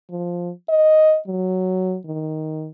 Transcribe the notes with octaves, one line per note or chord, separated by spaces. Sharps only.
F3
D#5
F#3
D#3